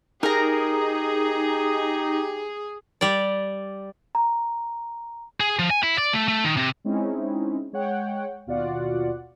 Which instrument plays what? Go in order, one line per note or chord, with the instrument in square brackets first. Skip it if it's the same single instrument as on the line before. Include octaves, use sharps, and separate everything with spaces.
[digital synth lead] D#4 [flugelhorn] G4 [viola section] G#4 [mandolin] A#4 A#5
[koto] G3 D5
[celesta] A#5
[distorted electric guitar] G#4
F3
G#5
E4
D5
A3
A3
D#3
C3
[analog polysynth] G#3 C4 C#4 D#4 E4
G#3 C#5 F#5 G5
D#2 B2 F4 F#4 D5 F#5